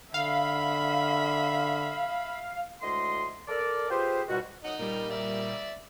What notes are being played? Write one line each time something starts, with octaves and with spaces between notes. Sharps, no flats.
D3 E5 F5 B5
D2 A2 G#3 D#5 C6
A4 A#4 D5
F4 G4 G#4 B4 C5
C#2 G#2 B2 G3 F#4
F#2 D#4 D#5 F#5
A#2 G3 A#4
D5 E5